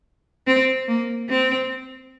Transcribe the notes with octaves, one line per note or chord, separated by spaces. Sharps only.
C4
A#3
C4